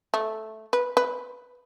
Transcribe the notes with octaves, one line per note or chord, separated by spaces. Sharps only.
A3
B4
B4